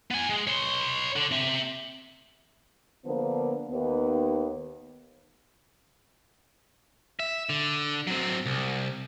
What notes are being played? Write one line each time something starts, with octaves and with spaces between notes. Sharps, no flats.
B3 G#5
G#3
C#5 C6
D3
C4 E5
D3 F3 A#3 B3
D#2 B3
E5
D3
F#3 C4
C2